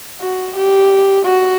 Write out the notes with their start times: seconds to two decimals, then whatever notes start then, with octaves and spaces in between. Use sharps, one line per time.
0.21 F#4
0.56 G4
1.25 F#4